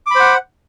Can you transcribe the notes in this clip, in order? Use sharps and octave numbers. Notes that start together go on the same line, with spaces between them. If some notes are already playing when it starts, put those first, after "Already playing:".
C5 F#5 B5 D6